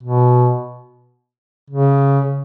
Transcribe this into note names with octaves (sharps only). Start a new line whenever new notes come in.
B2
C#3